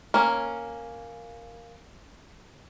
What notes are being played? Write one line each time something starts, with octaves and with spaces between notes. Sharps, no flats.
A#3 C#4